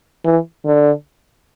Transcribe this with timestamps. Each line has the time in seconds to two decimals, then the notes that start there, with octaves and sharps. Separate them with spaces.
0.25 E3
0.66 D3